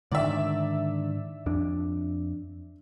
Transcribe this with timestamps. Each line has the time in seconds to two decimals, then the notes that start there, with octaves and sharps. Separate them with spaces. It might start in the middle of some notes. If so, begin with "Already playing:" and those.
0.12 G#2 D3 D#3 D5 E5
1.46 F2 D4